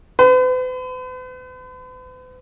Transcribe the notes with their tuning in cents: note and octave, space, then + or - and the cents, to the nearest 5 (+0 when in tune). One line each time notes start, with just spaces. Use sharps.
B4 +45